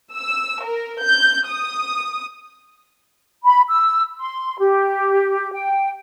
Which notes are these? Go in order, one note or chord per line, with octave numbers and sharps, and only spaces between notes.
E6
A#4
G6
D#6
B5
E6
C6
G4
G5